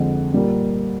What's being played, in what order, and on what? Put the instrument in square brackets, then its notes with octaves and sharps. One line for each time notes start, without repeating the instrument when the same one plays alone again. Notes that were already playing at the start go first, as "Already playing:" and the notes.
Already playing: [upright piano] F2 D3 F3 G#3 F#5
A#2 G3 A#3